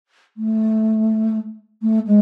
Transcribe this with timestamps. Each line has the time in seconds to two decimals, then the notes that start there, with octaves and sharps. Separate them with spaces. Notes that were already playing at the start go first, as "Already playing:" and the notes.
0.37 A3
1.82 A3
2.06 G#3